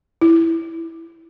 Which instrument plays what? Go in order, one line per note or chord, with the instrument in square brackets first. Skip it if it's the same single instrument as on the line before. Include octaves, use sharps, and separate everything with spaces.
[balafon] E4